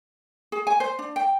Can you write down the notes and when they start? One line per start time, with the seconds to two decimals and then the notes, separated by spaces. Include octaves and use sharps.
0.52 G#4
0.67 G#5
0.80 C5
0.99 D4
1.16 G5